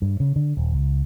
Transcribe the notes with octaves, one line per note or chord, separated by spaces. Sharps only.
G2
C#3
D3
D#1
C#2